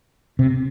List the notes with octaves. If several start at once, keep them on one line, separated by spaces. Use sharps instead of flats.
C3